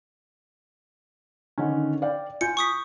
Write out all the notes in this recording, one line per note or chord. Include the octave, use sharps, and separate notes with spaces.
D3 D#3 C#4
D5 F5 G5
F4 G#5 G6 C#7
C#6 D#6 B6